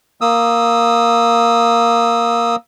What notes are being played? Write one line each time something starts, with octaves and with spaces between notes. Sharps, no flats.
A#3 D#6 E6